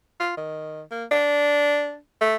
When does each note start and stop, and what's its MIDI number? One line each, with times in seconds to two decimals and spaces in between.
0.20 0.36 65
0.37 0.82 51
0.91 1.05 58
1.11 1.98 62
2.21 2.36 57